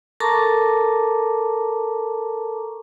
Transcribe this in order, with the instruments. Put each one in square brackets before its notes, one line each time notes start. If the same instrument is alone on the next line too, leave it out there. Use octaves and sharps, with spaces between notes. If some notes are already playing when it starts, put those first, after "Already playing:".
[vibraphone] A4 A#4 A5 A#5 C#6 D6